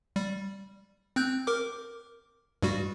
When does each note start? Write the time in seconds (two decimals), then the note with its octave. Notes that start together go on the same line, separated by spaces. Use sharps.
0.16 G3
1.16 C4 F#6 G6
1.47 A#4 D6
2.62 G2 G3 F#4